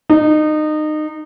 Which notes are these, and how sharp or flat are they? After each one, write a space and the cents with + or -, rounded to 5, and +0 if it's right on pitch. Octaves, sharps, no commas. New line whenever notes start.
D#4 -25